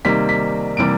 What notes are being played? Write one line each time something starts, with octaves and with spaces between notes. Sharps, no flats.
C3 D#3 G3 A#3 B6
B6
C3 E3 G3 A#3 D7